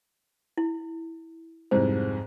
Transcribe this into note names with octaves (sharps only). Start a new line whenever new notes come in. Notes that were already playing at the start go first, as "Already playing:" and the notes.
E4
C2 F2 G#2 C5